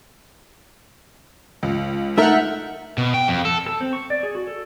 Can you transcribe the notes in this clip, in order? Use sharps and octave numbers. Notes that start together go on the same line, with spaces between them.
C#2
A3 D#4 A#4 E5 F#5 F6 G6
B2
G5
F2
A4
A4
C4
C#6
D5
G#4
F#4
A4